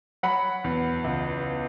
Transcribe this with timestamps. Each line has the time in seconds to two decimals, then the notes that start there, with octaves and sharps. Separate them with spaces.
0.23 F#3 F#5 B5
0.64 E2
1.04 C#2